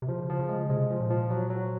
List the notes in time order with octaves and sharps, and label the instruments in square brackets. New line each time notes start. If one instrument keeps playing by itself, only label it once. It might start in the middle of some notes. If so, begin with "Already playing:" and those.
[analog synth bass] C3
[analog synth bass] C#3 [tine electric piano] F3
[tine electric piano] F3
[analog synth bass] C#3
[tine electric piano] G#3
[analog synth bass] C3 [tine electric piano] G#3
[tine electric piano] F3
[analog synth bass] A#2
[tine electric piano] F3
F#3
F#3